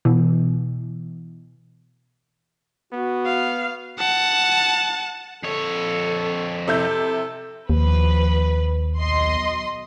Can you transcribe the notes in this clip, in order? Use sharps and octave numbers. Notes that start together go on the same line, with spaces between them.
B2 E3
B3 F#4
F5
F#5 A5
F2 A4 C#5
C3 E4 A4 G6
D#2 F3 B4
B1 D#5 C6